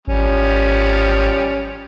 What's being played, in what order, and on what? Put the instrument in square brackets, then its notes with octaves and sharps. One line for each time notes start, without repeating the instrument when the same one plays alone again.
[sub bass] G#1 [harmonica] F3 G3 C#4